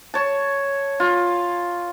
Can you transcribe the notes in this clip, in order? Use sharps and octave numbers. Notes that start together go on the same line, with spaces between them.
C#5 A5
F4